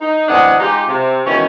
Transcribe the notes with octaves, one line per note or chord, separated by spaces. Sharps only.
D#4
D2 C3 E3 D4 D#5 F#5
G#3 D#4 F4 G4
C3
G#2 B2 D#3 E3 C#4